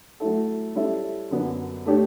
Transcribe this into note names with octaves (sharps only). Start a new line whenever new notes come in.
F#3 A3 E4 A4
G3 C#4 E4 A4 E5
F#2 D3 F#3 B3 D4
A3 D4 G4 C#5